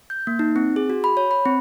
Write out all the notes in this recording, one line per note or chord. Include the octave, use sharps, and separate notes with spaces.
G6
A#3
D#4
C4
G#4
F#4
B5
C#5
B5
C4